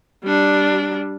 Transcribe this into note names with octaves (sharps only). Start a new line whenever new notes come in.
G3 D4